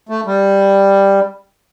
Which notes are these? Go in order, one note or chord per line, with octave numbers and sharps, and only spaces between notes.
A3
G3